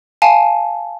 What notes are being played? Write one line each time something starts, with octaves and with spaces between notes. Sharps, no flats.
F5 G#5 A5